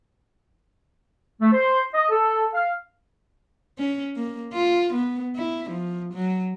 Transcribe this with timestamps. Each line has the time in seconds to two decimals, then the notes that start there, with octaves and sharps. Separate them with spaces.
1.41 A3
1.52 C5
1.94 D#5
2.10 A4
2.54 F5
3.78 C#4
4.16 A#3
4.53 F4
4.94 B3
5.36 E4
5.70 F3
6.14 F#3